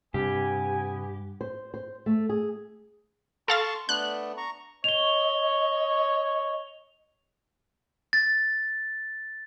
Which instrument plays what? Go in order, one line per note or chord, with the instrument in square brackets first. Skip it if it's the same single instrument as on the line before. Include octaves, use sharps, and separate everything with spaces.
[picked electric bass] G2 [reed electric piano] C3 [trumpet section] B3 G#5 [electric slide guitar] G4
[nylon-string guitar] C5
C5
A3
G#4
[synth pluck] A4 F5 A6 [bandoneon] A5 C6 C#6
[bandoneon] A3 B3 D4 [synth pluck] F#6
[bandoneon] A#5 C#6
[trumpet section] C#5 [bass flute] D#5 [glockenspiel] F7 G7
[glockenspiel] A6